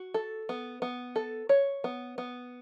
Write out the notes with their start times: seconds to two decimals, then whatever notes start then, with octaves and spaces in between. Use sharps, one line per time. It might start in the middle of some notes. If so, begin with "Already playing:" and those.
Already playing: F#4
0.14 A4
0.49 B3
0.82 B3
1.16 A4
1.49 C#5
1.84 B3
2.18 B3